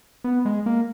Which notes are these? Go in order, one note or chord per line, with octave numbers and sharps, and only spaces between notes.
B3
G#3
A#3